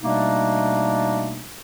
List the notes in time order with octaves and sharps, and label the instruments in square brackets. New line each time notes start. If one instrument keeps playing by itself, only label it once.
[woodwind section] B2 G3 A3 A#3 D4 D#4